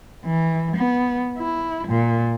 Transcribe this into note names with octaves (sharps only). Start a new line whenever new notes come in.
E3
B3
E4
A#2